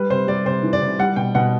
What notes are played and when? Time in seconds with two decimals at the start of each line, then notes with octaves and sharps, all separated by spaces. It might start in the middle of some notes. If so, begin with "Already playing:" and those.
Already playing: G3 B4
0.10 C3 C5
0.27 G3 D5
0.45 C3 C5
0.63 E3
0.73 D5
0.81 C3
0.99 G3 F#5
1.16 B2 G5
1.35 B2 F#5